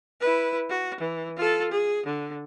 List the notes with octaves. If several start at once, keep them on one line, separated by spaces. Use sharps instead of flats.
E4 B4
F#4
E3
F4 A4
G#4
D3